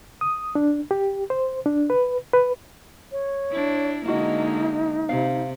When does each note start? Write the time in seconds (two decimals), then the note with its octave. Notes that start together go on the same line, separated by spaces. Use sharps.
0.21 D#6
0.55 D4
0.91 G4
1.30 C5
1.66 D4
1.90 B4
2.34 B4
3.12 C#5
3.51 D4 E4
4.06 D3 G#3 A#3 D#4 E4 F#4 D#5
5.09 C3 F5